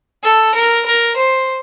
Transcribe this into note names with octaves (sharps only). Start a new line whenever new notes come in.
A4
A#4
A#4
C5